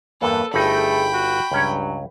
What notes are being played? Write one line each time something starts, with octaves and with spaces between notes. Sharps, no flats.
E2 G2 A#3 A4 B4
G1 G2 A3 D#4 G#4 G5 B5
F#4
C#2 G2 F#3 C#4 C#5